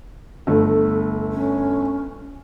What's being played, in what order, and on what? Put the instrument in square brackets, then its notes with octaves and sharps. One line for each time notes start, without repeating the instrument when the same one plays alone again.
[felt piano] G1 A3 [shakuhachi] A4
[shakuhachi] C#4